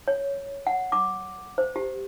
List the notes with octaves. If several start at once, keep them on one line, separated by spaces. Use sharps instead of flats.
C#5
F#5
D6
C5
G4